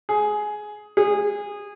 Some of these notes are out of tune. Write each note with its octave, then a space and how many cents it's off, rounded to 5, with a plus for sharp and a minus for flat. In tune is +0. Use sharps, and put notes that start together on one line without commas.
G#4 +15
G#4 -20